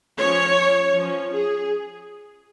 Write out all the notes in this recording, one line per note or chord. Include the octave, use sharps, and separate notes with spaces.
F3 C#4 C#5
F3 C#4
G#4